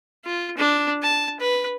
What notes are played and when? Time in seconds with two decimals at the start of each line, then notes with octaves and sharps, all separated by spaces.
0.25 F4
0.57 D4
1.02 A5
1.40 B4